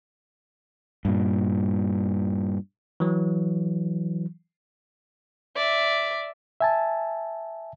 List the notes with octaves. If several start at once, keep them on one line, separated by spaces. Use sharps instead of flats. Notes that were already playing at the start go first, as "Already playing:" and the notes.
G2 A#2
E3 F#3
D5 E5
E5 G#5 A5